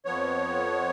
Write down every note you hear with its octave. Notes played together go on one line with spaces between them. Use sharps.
F2 F3 B3 C#5